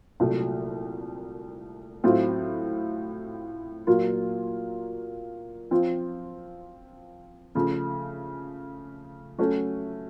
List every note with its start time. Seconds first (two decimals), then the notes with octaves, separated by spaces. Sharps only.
0.20 C2 A#2 F#3 A3
2.04 A2 F#3 C4 F4
3.87 A#2 F#3 A#3 F4
5.71 F3 C4 F4
7.55 C#3 F3 A3
9.38 F#3 A3 C#4 F#4 A4